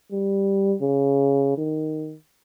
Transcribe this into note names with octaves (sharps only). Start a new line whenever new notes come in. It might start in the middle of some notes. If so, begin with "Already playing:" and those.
G3
C#3
D#3